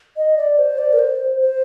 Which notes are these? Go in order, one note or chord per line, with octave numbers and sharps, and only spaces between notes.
D#5
D5
C5
D5
A#4
C5
C5